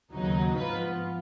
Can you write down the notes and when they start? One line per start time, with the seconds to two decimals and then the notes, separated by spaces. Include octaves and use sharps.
0.13 D#2 C#3 F#3 B3 D#4
0.57 G#2 F3 B3 F4 B4